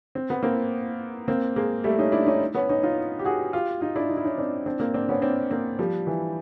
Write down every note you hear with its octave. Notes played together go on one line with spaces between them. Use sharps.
C4
B3
A#3 C4
A#3 C4
G#3 A#3
G3 A3
C#4 D#4
D4 E4
C#4 D#4
B3 C#4
C#4 D#4
D#4 F4
G4
F#4 G#4
F4 G4
D#4 F4
D4 E4
D#4
E4
C#4 D#4
C4 D4
C4 D4
A#3 C4
C4 D4
B3 C#4
C4 D4
A#3 C4
F3 G3
E3